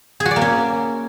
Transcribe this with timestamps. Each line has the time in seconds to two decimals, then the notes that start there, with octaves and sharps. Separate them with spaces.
0.20 G#4
0.25 F#4
0.31 D5
0.36 A#3
0.41 C#4